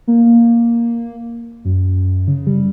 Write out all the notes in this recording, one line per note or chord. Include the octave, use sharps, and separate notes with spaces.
A#3
F#2
C#3
G3